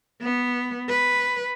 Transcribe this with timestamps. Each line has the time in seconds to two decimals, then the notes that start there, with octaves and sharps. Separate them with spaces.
0.22 B3
0.89 B4